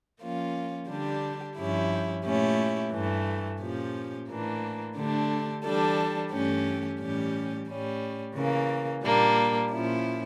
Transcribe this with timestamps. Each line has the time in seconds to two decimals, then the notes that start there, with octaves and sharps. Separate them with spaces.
0.21 F3 A#3 C#4 F4
0.89 D3 G3 D4 G4
1.57 G2 F3 C#4 E4 G4
2.25 A#2 A3 C#4 E4 G4
2.93 G2 E3 A3
3.61 A#2 F3 C#4 G4
4.29 A2 E3 A#3 D4
4.97 D3 A3 D4 G4
5.65 E3 G3 D4 A4
6.32 G2 E3 A3 C#4 G4
7.00 A2 E3 G3 C#4 G4
7.68 A2 G3 C#4
8.36 C#3 E3 A#3
9.03 A#2 G3 A#3 D4
9.71 A#2 F3 C#4 E4